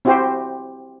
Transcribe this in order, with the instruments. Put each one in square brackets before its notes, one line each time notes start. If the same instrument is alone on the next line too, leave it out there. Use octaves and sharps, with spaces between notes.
[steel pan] C4 E4 F#4 G4 C5